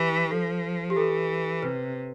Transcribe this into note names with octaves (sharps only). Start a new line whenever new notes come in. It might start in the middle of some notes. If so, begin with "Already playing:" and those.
Already playing: E3 G4
F3 A4
G4
E3 A4
C3 B4